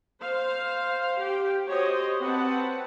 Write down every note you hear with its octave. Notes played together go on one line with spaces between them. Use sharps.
C5 F5
G4 G5
F#4 G4 C5 C#5 D#5
C4 B4 F#5 A5